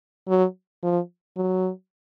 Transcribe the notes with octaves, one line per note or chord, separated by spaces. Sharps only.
F#3
F3
F#3